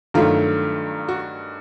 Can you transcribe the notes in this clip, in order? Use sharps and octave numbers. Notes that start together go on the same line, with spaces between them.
G2 D#3 F#3 A3 F4
F#4